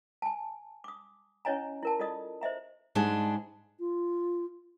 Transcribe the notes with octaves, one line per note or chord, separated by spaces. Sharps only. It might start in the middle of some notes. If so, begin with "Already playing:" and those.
G#5 A5
D6 D#6
C#4 E4 C#5 D#5 G#5 A#5
E4 A#4 A5
F4 A4 D5 D#5 D#6
C5 D#5 E5 A#5
G#2 G3 G#3 D4 A5
F4